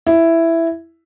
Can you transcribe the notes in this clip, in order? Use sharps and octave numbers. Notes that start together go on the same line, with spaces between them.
E4